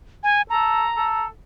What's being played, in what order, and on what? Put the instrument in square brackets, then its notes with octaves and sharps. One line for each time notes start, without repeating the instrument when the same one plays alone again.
[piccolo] G#5
[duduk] A4 [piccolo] A#5
[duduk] A4